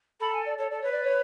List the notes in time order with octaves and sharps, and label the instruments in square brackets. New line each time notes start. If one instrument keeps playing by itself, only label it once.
[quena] A4 [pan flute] B5
[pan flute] G#5
D5
[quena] A4 [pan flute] C#5
[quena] A4 [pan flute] D5
[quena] B4 [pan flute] C#5
[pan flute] D5
C#5